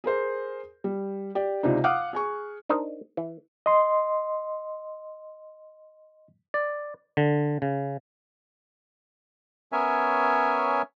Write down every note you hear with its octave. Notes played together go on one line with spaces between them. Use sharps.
G#4 A#4 C5
G3
G4 D5
C#2 C3 D4 D#4
F5 F#5 D6 D#6 F6 F#6
G#4 G#5 C#6
D4 D#4 A#4 C5 D#5
E3
D#5 C6
D5
D3
C#3
B3 C#4 A#4 C#5 E5 G#5